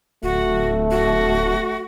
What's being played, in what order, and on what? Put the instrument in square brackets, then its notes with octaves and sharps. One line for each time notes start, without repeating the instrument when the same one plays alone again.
[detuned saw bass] D1 [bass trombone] A3 [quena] F#4
[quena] F#4